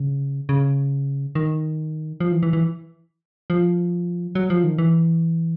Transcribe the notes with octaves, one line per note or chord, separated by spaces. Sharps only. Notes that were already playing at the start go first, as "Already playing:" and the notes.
Already playing: C#3
C#3
D#3
F3
E3
E3
E3
F3
F#3
F3
D#3
E3